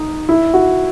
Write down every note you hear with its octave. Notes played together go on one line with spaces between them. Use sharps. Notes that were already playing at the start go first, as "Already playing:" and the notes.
Already playing: D#4
E4
F#4